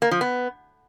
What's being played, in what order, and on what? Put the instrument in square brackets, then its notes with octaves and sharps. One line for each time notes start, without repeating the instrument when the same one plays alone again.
[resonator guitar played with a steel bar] A#3
F3
B3